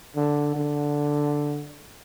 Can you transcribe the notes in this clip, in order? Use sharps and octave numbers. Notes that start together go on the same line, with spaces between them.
D3
D3